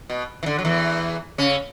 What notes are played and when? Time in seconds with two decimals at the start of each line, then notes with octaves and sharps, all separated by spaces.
0.10 B2
0.43 E3
0.46 D3
0.58 F#3
0.65 E2 E3
1.38 C#3 C#4